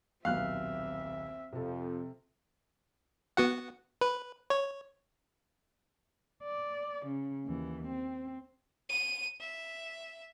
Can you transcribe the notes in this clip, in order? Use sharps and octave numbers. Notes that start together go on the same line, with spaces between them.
D#1 B1 C4 E5 F5 F#6
F2 C3 F3 A4
B3 F#4 F#5
B4
C#5
D5
C#3
D#2 E3
C4
D#7
E5